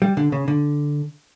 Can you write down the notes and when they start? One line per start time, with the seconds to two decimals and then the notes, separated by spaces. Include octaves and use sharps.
0.02 G3
0.17 D3
0.32 C#3
0.48 D3